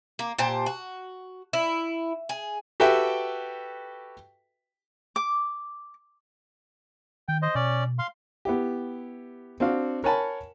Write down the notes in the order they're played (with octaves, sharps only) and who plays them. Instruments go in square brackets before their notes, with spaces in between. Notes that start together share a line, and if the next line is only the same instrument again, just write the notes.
[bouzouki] A#3
A#2 G4 C5 A5
F#4
E4
G#4
[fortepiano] F#4 G4 A4 B4 E5 G5
[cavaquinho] D6
[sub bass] D#3 [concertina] G5
[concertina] C5 D#5
[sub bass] B2 [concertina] C#4 D5
[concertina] F5 C6
[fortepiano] B3 E4 G4
C4 D4 F#4 F5
A#4 C#5 F#5 G#5 A5 B5